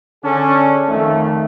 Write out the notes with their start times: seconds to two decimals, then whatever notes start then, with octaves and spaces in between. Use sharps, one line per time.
0.24 D3 C#4 D4 G#4 A4
0.89 F2 D#3 A3